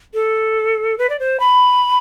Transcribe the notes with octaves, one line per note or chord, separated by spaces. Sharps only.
A4
B4
D5
C5
B5